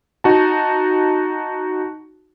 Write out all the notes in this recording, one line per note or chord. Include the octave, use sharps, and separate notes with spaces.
D#4 F#4 A5